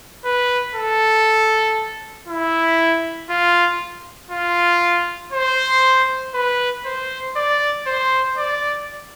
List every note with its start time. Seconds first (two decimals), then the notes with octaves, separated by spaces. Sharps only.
0.25 B4
0.75 A4
2.28 E4
3.29 F4
4.31 F4
5.33 C5
6.35 B4
6.85 C5
7.36 D5
7.87 C5
8.37 D5